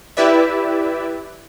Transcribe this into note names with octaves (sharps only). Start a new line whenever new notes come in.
E4 G4 B4 D5 E5